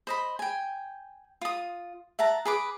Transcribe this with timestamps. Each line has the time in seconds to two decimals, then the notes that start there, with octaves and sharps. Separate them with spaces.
0.07 C5 D#5 B5
0.39 G5 G#5
1.41 F4 D#6
2.19 E5 F#5 A5 A#5
2.45 G#4 B4 D6